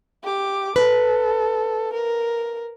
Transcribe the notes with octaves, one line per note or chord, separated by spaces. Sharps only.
G4 D6
A4 B4
A#4